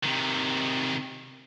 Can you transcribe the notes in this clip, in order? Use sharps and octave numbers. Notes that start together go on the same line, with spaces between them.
C3 D#3